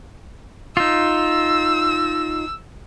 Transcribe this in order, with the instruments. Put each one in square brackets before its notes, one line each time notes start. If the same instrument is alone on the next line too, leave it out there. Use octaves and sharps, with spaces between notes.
[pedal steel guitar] D#4 F4 [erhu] E6